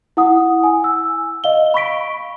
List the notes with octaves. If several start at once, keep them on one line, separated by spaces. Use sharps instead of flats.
E4 F#5 D#6
G#5
E6
D#5 F5 G7
B5 C#6 B6 D7